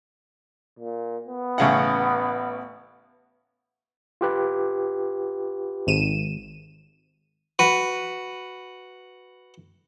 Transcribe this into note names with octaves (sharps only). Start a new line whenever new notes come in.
A#2
B3
A1 C#3 F#5
F4 G4 B4
G#1 D#7 E7
F#4 B4